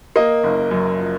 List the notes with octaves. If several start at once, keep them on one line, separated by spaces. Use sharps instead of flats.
A#3 D#5
F#1
F#2
F3